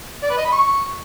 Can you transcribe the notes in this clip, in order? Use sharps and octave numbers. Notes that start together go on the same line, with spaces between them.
D5
B4
D#5
B5
C#6